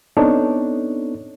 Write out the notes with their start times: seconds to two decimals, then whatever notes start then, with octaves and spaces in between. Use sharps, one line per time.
0.17 B3 C4 D4 D#4 A4 C#5